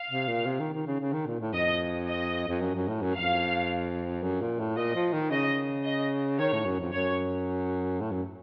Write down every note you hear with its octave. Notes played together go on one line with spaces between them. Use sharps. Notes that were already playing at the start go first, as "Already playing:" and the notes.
Already playing: F5
C3
A#2
C3
D#3
D#3
C#3
C#3
D#3
A#2
A2
F2 D#5
D#5
F2
F#2
F#2
A2
F#2
F2 F5
F#2
A#2
A2
A#2 D#5
F3
D#3
C#3 D#5
D#5
D#3 C#5
A2
F#2
F2
F#2 C#5
A2
F#2